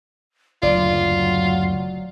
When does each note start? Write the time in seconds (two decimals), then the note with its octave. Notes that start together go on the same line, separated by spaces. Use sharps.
0.63 F#1 D2 F#3 F4 D5